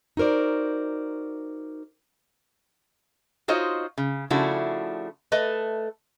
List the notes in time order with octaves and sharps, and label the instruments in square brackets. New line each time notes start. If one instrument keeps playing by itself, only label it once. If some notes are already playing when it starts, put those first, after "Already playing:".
[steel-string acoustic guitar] D#4 F#4 A#4 C5 D5
[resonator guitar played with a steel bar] D#4 F4 F#4 C5 C#5 D#5
C#3
C#3 F3 A3 D4 E4 F#4
A3 B4 D#5